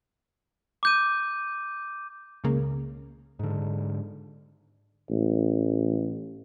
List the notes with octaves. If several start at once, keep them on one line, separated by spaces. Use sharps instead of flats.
D6 G6 D#7
C#2 C#3 A#3
G#2 D3
A1